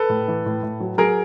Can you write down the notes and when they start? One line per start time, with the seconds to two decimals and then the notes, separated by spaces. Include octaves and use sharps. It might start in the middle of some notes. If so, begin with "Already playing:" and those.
Already playing: A4 B4
0.09 A2
0.28 E3
0.46 A2
0.63 A2
0.80 F#3
0.98 F#3 G#4 A#4